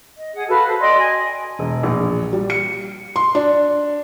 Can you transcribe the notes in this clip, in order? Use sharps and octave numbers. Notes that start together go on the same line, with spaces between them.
D#5
G#4 F#5
F#4 A4 B4 F5
A4 C5
D5 D#5 G5 C6
G#5
E1
A#1
G3
C#7
C6
D4